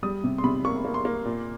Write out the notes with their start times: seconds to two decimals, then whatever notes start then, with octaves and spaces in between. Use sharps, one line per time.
0.03 G3 D#6
0.24 C3
0.38 C6
0.44 C3 B5
0.65 A#3 C#6
0.85 A#3
0.94 C6
1.05 A#3
1.25 A#2